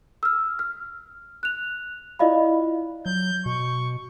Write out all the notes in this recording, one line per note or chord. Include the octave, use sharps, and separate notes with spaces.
E6 F6
F6
F#6 F7
E4 F4 D5 D#5 F5 B5
F#3 G6
B2 C#6